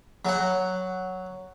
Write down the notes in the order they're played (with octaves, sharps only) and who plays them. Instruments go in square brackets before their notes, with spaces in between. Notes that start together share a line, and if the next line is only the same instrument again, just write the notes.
[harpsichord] F#3 F#5